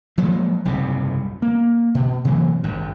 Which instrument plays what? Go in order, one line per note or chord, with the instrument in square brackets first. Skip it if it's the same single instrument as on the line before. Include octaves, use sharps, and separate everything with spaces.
[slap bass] F3 F#3 G#3 A#3
F#1 C2 G#2 C3
A#3
B2
C3 E3 F#3 A#3
G#1 G2